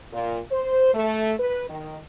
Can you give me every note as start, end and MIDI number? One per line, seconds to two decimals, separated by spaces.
0.13 0.39 46
0.51 0.93 72
0.94 1.33 57
1.39 1.69 71
1.69 1.98 51